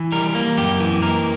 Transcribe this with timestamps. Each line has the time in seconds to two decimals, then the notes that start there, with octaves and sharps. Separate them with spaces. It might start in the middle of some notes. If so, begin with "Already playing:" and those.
Already playing: E3
0.12 G3 A#4
0.35 A#3
0.57 F#2 G4
0.80 E3
1.02 A#3 A#4